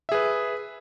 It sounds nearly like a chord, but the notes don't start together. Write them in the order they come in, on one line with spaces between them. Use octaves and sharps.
E5 G#4 B4